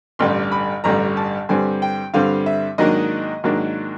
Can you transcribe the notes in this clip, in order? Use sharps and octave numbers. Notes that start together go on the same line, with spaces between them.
A1 G2 D3 G3 C6
B5
A1 G2 D3 G3 A#5
A5
G2 D3 G3 C4 G#5
G5
G2 D3 G3 C4 F5
E5
G#2 D#3 F#3 A#3 D4 D#5
G#2 D#3 F#3 A#3 D4